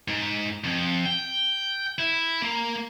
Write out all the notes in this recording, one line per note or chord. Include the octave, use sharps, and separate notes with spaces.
G#2
F2
G5
E4
A#3